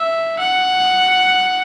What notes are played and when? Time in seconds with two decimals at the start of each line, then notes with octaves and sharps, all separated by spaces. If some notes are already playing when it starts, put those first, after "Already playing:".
Already playing: E5
0.39 F#5